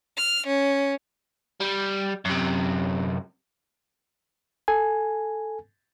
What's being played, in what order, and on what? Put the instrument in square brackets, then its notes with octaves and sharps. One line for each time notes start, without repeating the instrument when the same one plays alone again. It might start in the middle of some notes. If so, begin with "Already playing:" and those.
[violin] F6
C#4
[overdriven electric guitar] G3
F#2 C3
[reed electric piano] A4 G#5